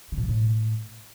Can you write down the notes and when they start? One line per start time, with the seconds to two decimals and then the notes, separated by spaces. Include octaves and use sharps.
0.12 D3
0.18 A#2
0.23 G3
0.29 A2